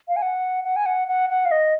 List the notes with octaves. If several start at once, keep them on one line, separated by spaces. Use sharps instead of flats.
F5
G#5
F#5
F#5
G#5
F#5
F#5
F#5
F5
D#5